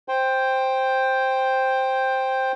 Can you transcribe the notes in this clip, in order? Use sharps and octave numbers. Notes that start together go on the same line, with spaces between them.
C5 G5